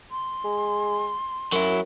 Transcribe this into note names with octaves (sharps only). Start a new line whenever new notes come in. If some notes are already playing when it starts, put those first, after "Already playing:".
C6
G#3
F#2 F#3 E4